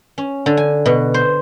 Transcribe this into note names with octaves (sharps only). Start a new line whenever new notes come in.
C#4
D3
G#5
B2
C5